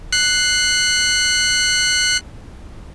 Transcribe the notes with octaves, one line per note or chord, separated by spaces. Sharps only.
F#6 C7